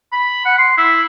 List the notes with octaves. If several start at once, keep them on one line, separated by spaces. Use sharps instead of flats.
B5
F#5
C6
E4